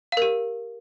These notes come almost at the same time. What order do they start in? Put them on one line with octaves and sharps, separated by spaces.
F5 A#4 G4